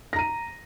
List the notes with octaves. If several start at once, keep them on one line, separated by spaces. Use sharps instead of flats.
A#5 A#6 D#7